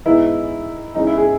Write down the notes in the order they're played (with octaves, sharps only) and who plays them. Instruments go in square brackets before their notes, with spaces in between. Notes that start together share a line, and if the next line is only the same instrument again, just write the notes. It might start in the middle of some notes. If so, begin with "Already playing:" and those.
[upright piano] E3 G#3 B3 D#4 E4
E3 G#3 C#4 D#4
E4
G#4